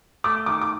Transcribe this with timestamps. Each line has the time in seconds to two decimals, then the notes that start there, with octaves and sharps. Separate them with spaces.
0.24 A3 D6
0.46 D#3 D6
0.61 D6